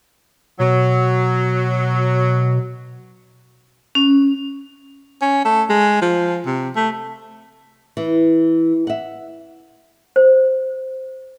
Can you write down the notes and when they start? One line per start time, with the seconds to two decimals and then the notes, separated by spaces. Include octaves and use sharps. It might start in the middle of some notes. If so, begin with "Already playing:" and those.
0.59 B2 F#3
3.95 C#4
5.22 C#4
5.45 A3
5.70 G#3
6.02 F3
6.46 C3
6.76 A3
7.97 E3
8.87 E5 F#5
10.16 C5